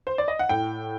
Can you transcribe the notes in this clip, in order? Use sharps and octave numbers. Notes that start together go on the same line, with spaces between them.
C5
D5
D#5
F#5
A2 G5